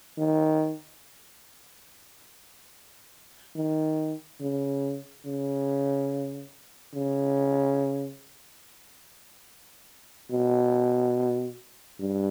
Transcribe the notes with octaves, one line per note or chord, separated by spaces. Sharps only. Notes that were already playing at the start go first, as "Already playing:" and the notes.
D#3
D#3
C#3
C#3
C#3
B2
G2